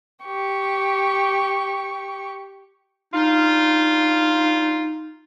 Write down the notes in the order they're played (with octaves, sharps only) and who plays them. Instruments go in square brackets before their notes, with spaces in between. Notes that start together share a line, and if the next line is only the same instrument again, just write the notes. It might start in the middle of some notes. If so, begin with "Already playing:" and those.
[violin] G4 C#6
[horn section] G2 F4 [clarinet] D#4